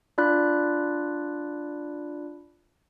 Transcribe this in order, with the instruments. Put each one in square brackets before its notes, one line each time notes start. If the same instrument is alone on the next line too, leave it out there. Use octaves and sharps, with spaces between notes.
[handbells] D4 F4 D5 B5 F#6